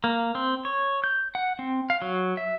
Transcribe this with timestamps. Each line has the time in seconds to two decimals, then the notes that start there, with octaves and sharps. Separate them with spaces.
0.04 A#3
0.35 C4
0.65 C#5
1.04 G6
1.35 F#5
1.59 C4
1.90 F5
2.02 F#3
2.37 E5